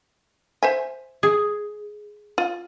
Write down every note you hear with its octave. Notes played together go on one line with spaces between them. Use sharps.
C5 E5 G#5
G#4
F4